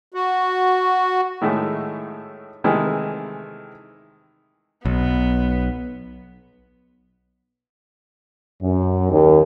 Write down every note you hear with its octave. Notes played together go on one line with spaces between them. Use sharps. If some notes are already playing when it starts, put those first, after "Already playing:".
F#4
A2 D#3 G#3 A3
C3 D#3 E3 G#3 A3
B1 B3
F#2
D#2